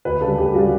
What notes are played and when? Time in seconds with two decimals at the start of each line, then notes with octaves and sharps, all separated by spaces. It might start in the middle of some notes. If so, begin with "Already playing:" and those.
0.05 D2 B4
0.21 C#3 G3 A4
0.38 D2 G4
0.54 C#3 G3 F#4